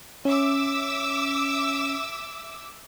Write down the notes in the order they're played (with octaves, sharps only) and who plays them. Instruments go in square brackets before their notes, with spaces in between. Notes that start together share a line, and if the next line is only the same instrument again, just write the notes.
[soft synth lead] C#4 [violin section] E5 D6 E6